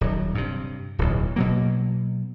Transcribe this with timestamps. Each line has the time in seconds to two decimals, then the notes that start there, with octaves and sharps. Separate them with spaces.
0.01 D#1 F#3
0.35 G2 C3
0.99 D1 B1
1.36 B2 F#3 A#3